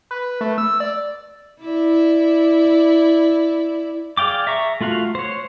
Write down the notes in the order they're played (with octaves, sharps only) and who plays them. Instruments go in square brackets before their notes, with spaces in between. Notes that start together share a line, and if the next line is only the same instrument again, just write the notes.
[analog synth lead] B4
A3
E6
D5
[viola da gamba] E4 D5
[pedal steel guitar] G#4 D5 F5 G5 D6
E5 A#5 C#6
A3 F4 F#4 F5
C5 C#5